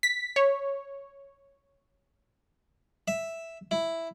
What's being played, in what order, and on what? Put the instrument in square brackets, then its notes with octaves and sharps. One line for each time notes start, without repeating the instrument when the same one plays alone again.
[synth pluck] B6
C#5
[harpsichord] E5
E4